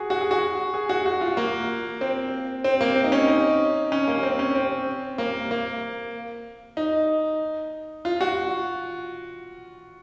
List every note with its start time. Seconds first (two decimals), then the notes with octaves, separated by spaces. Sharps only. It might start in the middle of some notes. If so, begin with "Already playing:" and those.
Already playing: F#4 G#4
0.10 F#4
0.21 G#4
0.31 F#4
0.74 G#4
0.89 F#4
1.06 F#4
1.21 F4
1.37 A#3
2.01 C4
2.64 C4
2.81 A#3
2.96 C4
3.04 D#4
3.12 C#4
3.28 D#4
3.92 C#4
4.08 A#3
4.23 C4
4.39 C#4
4.55 C4
5.18 A#3
5.51 A#3
6.77 D#4
8.05 F4
8.21 F#4